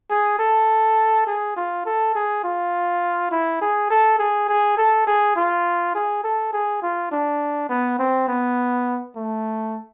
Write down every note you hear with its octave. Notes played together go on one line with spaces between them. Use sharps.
G#4
A4
G#4
F4
A4
G#4
F4
E4
G#4
A4
G#4
G#4
A4
G#4
F4
G#4
A4
G#4
F4
D4
B3
C4
B3
A3